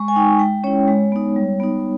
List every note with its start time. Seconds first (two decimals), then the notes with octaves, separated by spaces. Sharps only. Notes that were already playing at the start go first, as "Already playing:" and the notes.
Already playing: G#3 C#6
0.08 G#5
0.16 D#4 G5
0.39 G#3 G5
0.64 C#4 E4 C#5
0.88 G#3
1.12 B3 D#4
1.36 G3
1.60 B3 D#4